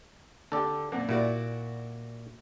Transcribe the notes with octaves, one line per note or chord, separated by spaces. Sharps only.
D3 G4 A4 D5
F#2 A#2
A#2 E4 F#4 D5